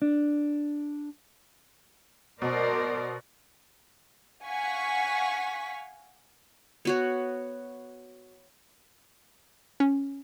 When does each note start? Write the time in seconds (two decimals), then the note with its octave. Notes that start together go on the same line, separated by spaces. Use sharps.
0.02 D4
2.42 B2 A#4 C5 D5
4.46 F5 F#5 G#5 C#6 B6
6.85 B3 F#4 C#5
9.80 C#4